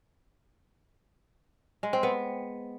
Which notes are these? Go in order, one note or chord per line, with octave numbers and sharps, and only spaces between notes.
G#3
C4
B3